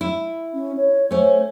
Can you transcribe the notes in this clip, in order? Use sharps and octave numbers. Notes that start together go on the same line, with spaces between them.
E4
C#4
C#5
A3 C#4 C5